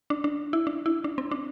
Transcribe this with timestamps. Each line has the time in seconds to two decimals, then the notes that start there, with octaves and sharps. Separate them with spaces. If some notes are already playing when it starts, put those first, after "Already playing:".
0.10 D4
0.24 D4
0.53 E4
0.67 D4
0.86 E4
1.04 D4
1.18 C4
1.31 D4